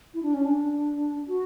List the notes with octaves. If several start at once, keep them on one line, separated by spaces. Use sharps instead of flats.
E4
D4
C#4
D4
F#4